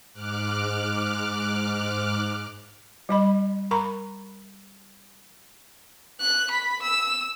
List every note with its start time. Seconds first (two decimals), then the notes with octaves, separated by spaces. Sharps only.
0.13 G#2 D6 F6 F#6
3.09 G3 D#5 B5
3.71 A#4 A#5 B5 C#6
6.21 F#6
6.51 B5
6.83 E6